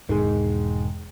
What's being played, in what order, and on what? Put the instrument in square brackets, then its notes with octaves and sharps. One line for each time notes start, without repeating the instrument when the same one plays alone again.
[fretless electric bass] E1 G#2 [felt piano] D#3 G#3